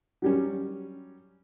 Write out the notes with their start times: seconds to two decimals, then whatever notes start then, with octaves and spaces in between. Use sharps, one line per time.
0.22 F#3 G3 C#4